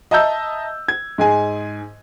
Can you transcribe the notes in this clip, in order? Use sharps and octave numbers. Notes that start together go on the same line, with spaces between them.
D#5 E5 A5 A#5 E6 G6
G#6
G#2 G#4 G#5